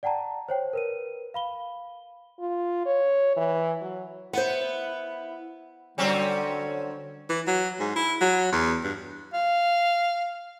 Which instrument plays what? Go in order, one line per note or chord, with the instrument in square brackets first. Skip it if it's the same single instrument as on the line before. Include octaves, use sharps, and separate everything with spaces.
[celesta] D5 F#5 G5 A5 A#5
C5 C#5 G5
A#4 B4 D#7
F5 B5 G7
[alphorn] F4
C#5
E3
F#3
[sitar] B3 [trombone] E4 [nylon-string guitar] C5 F#5
[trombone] D3 [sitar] F#3 C4 C#4 [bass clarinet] G3
[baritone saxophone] E3
F#3
G#2
E4
F#3
E2
G2
[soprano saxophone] F5